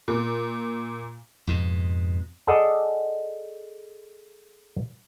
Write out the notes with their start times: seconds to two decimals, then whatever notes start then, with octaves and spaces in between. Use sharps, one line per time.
0.08 A#2
1.47 F2 G#2 B2
2.47 G#4 A4 D5 D#5 F#5 A5